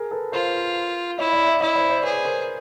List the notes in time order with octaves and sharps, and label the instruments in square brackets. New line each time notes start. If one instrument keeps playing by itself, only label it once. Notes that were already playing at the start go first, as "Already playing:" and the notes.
Already playing: [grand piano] G#4 A#4
A4 B4
[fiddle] F4 [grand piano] A#4 C5
[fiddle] E4 [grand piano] C#5 D#5
[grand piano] D5 E5
D5 E5
[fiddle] E4 [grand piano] C#5 D#5
[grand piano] C5 D5
C5 D5
[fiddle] G#4 [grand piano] B4 C#5
[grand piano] A#4 C5